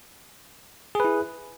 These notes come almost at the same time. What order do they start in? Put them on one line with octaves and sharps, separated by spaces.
G#4 B4 E4